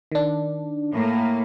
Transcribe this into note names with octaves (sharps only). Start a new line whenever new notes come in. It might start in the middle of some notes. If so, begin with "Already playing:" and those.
D#3 D4
A2 A#3